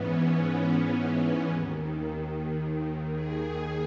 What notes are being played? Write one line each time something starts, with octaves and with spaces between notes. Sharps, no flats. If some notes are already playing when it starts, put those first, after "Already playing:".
Already playing: G#2 E3 B3 C#4
B3
D#2 D#3
G#4